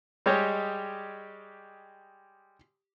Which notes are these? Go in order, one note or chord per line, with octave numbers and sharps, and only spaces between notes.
G3 G#3 G4 C#5 D#5